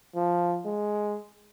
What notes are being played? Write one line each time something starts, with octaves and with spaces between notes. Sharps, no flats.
F3
G#3